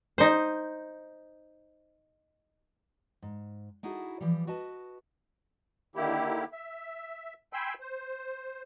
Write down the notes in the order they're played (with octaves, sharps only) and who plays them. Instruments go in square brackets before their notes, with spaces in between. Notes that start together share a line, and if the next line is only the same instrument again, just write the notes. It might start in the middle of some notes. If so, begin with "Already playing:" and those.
[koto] D#4 C5
[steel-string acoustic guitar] G#2
D#4 E4 F#4 G#4 A4
E3 F3 G3
F#4 B4 D#5 A5
[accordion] D3 D#3 A#3 E4 G4
E5
G5 G#5 B5 C6 E6
C5